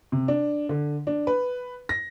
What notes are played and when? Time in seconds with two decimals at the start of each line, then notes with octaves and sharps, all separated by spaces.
0.12 C3
0.28 D4
0.69 D3
1.07 D4
1.27 B4
1.89 A#6